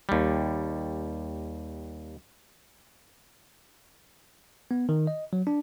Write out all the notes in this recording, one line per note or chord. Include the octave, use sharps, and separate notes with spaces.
D#2 G3
B3
D#3
D#5
F#3
D4